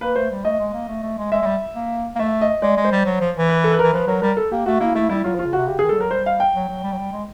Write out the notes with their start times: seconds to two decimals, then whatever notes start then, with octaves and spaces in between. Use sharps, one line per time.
0.01 A#3 B4
0.16 A3 C5
0.31 G3
0.45 A3 D#5
0.59 G#3
0.73 A#3
0.88 A3
1.03 A3
1.18 G#3
1.32 G#3 E5
1.42 G#3
1.46 G3
1.75 A#3
2.16 A#3
2.19 A3 E5
2.41 D#5
2.62 G#3 D5
2.77 G#3
2.84 C5
2.92 G3
3.06 F#3
3.21 F3
3.36 E3
3.49 B4
3.64 A4
3.72 B4
3.79 E3 A#4
3.93 F3 B4
4.07 F#3 A#4
4.22 G3 A#4
4.37 A4
4.52 A#3 G4
4.66 A3 F#4
4.80 A#3 E4
4.95 A3 E4
5.09 G3 E4
5.24 F#3 F4
5.35 F3
5.39 F4
5.45 C#3
5.53 C3 F#4
5.67 C#3 G4
5.79 G#4
5.82 D#3
5.89 G3 A4
5.97 F#3 A#4
6.11 G3 C5
6.26 F5
6.40 G5
6.55 F#3
6.69 F#3
6.83 G3
6.92 F#3
6.98 G3
7.12 G#3